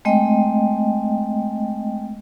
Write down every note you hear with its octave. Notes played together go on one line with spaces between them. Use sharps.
G#3 A3 C4 D#5 G5